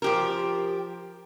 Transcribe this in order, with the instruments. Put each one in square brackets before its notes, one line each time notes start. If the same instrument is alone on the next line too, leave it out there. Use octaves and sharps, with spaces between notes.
[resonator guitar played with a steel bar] F3 G4 A#4